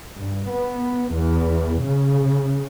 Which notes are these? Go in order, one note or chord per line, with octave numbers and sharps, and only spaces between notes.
G2
B3
E2
C#3